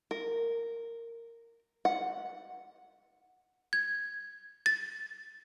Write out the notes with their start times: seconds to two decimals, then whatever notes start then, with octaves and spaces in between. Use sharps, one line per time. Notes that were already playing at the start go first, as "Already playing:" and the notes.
0.11 A#4
1.85 F#5
3.73 G#6
4.66 A6